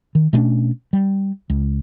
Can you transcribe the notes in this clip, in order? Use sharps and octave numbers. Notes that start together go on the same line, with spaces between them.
D#3
B2 A3 C#4 D4
G3
C#2